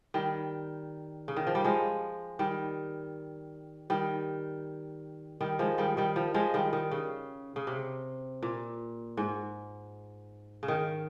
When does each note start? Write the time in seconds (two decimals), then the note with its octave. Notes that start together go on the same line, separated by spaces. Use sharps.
0.14 D#3 G3
1.28 C#3
1.36 D#3
1.47 F3
1.55 G3
1.64 F3 G#3
2.39 D#3 G3
3.90 D#3 G3
5.41 D#3 G3
5.59 F3 G#3
5.78 D#3 G3
5.97 D#3 G3
6.16 F3
6.34 F3 G#3
6.54 D#3 G3
6.73 D#3
6.91 C#3
7.56 C#3
7.67 C3
8.42 A#2
9.17 G#2
10.63 C#3
10.68 D#3